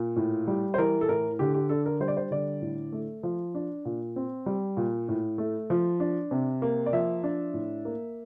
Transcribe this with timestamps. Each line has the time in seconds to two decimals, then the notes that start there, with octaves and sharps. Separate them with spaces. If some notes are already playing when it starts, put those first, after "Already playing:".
Already playing: A#2
0.16 A2
0.47 G3
0.74 C5
0.78 E3 A#4
1.01 A4
1.09 A2 A#4
1.39 D3 G4
1.54 G4
1.69 D4 A4
1.86 A#4
2.00 G3 C5
2.08 D5
2.17 C5
2.31 D3 D5
2.62 A2
2.92 A3
3.23 F3
3.55 D4
3.85 A#2
4.16 C4
4.46 G3
4.77 A#2
5.09 A2
5.38 A3
5.70 F3
6.00 D4
6.31 C3
6.62 A#3
6.86 D5
6.93 F3 E5
7.24 D4
7.54 A2
7.85 A#3